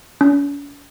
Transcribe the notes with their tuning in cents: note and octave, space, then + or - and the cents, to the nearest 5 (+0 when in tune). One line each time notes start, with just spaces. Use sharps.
C#4 +45